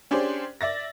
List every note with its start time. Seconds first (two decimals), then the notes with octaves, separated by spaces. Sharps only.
0.11 C#4 D4 G4 G#4 C5 D5
0.61 D5 E5 A6 A#6